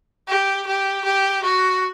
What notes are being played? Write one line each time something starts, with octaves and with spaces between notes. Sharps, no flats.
G4
G4
G4
F#4